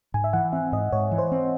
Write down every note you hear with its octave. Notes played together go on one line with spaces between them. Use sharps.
G#2 G#5
E5
E3 F#5
C4 E5
G#2 D#5
G#2 C#5
E3
C5
C4